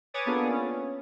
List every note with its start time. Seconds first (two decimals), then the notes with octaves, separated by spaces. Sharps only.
0.14 B4 C#5 G#5 D6 D#6 A6
0.26 A#3 B3 D4 F4 G#4 A4
0.51 C#4